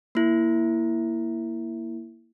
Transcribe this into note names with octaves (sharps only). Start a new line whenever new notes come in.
A#3 E4